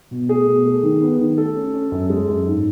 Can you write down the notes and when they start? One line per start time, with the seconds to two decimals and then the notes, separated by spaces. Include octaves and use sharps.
0.11 B2
0.29 A3 G#4
0.47 B2
0.65 A3
0.83 D#3
1.01 B3
1.19 D#3
1.38 A3 A4
1.56 C#4
1.74 C#4
1.92 F#2
2.10 G#3
2.28 F#2
2.46 G#2